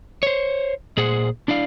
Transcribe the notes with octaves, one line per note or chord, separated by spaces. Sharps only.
C5 C#5
A#2 G#4 C5 F#5
D4 E4 D5 F5